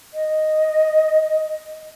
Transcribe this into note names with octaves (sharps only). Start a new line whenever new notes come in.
D#5